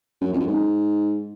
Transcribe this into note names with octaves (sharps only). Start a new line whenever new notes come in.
F#2
F2
F#2
G#2